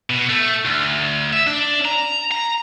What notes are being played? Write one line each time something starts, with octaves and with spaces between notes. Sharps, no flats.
B2
A3
D2
E5
D4
A#5
A#5